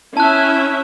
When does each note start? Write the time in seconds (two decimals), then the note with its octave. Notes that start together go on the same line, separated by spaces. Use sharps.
0.17 C#4 E4 E5 A5 F#6